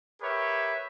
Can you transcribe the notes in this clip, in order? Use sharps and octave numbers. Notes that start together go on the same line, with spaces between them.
G4 A#4 B4 C#5 E5